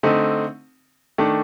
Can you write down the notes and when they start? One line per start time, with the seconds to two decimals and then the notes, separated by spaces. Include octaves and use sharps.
0.03 D3 A3 C4 D#4
1.18 D#3 A3 D4